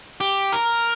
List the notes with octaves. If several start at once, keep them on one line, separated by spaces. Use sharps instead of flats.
G4
A#4